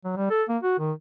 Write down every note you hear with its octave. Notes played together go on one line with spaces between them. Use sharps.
F#3
G3
A4
A#3
F#4
D#3